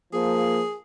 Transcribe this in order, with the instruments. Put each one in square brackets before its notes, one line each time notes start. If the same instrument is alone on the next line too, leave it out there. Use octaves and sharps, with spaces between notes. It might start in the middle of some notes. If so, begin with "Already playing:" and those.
[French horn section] F3 A#3 [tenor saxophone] G#4